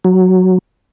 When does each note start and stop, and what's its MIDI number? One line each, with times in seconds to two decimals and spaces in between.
0.05 0.58 54